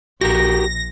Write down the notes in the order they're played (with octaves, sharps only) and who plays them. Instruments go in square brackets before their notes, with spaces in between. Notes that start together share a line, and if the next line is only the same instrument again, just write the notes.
[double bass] A#1 [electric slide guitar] F#4 G4 A#4 [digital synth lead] A#6